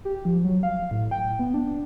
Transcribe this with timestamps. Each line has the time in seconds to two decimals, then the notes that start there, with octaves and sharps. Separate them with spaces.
0.05 G4
0.25 F3
0.44 F#3
0.63 F5
0.91 A2
1.11 G5
1.39 B3
1.54 D4